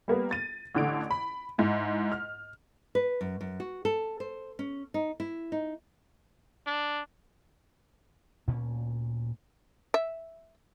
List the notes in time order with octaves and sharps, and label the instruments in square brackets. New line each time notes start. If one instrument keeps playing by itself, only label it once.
[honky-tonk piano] G3 A#3 B3
A6 D#7
A1 D3 D7
B5
G#2 E4
F6
[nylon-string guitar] B4
F#2
F#2
F#4
A4
C5
C#4
D#4
E4
D#4
[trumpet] D4
[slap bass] D2 A#2 C#4
[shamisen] E5